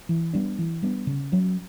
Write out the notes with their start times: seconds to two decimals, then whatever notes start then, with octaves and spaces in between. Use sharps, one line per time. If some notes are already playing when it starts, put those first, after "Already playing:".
0.09 E3
0.33 G3 B3 D4
0.59 E3
0.83 G3 B3 D4
1.07 C#3
1.32 F#3 C#4